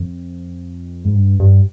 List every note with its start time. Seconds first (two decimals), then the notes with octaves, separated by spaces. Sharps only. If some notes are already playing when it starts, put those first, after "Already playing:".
Already playing: F2
1.05 G#2
1.15 G2
1.40 G2